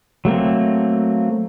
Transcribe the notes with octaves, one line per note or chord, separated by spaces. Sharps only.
F#3 A3 A#3 C4